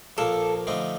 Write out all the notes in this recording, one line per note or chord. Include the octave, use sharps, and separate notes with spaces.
A#1 A#2 F3 A#3 A4
D3 F3 A3 C4 D#4